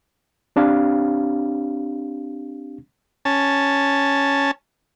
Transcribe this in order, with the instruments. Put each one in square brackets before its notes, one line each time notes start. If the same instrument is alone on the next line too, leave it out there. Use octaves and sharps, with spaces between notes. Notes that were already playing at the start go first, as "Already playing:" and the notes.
[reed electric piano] C4 D4 G4 F5
[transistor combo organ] C#4 A5